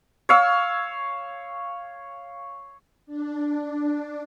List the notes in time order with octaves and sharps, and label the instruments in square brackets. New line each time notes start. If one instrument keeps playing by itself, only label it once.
[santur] C#5 F5 E6
[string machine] D4